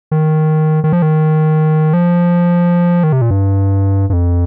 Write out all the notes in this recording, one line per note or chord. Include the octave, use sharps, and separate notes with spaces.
D#3
D#3
F3
D#3
F3
D#3
C3
A#2
G2
G2
F2